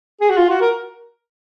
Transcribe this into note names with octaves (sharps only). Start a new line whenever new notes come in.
G#4
F#4
F4
F#4
A#4